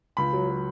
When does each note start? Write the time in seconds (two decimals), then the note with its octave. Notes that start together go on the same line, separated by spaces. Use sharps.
0.17 C#2 B5
0.33 F#3
0.49 F#3